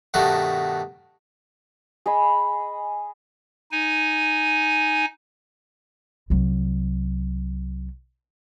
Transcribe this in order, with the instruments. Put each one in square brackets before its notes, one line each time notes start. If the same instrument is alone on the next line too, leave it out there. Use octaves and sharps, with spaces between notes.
[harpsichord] G2 B2 D#3 A3 F#4
[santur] G#4 D#5 G#5 B5
[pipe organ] D#4 G#5
[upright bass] C2 F#3